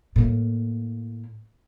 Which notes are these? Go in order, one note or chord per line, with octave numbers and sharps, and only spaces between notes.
A2 A#3